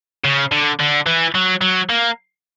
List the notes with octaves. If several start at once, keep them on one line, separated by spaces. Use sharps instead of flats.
C#3
D3
D3
E3
F#3
F#3
A#3